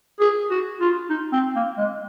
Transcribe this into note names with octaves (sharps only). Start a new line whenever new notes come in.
G#4
F#4
F4
D#4
C4
A#3
G#3